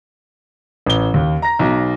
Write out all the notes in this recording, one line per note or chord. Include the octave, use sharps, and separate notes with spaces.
A1 G7
D#2
A#5 A#6
B1